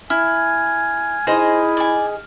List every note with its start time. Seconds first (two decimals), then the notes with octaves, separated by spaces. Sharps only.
0.10 E4 G#5 F6
1.27 D#4 E4 G#4 C5 D#5
1.77 D5 G#5